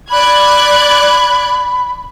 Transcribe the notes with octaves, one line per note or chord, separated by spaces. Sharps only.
D5 B5 F#6 G#6